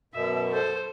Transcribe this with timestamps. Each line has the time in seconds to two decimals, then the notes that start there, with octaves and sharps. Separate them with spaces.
0.14 F#2 B2 E5
0.51 A4 C5